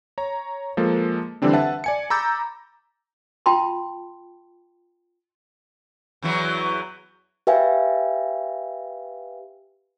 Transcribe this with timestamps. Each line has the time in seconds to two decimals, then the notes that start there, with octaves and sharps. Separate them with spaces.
0.18 C#5 A#5
0.77 F3 G#3 A#3 A4
1.42 D3 E3 G3 C4 D4
1.53 B4 E5 F#5 A5
1.84 D5 G#5 C#7
2.10 A#5 B5 D6 E6 G6 A6
3.46 F4 G5 A5 B5 C6
6.22 E2 E3 F#3
7.47 G4 B4 E5 F5 G5 G#5